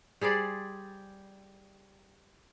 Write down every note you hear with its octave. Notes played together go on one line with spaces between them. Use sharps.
G3 G#4 C5 D5